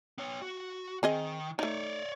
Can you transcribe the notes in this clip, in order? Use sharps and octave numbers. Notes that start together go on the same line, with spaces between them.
B3 C#5
F#4
D#3 C4 G#4 D#5
A3 D#4 C#5 D5